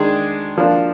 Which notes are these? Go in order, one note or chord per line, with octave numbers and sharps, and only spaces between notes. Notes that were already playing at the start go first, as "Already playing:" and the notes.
Already playing: D#3 G#3 D4 G#4
F3 A#3 D4